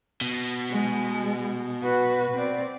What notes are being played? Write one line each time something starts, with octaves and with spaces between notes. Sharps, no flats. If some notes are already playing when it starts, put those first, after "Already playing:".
B2
G#3
F#4 B4
C4 D5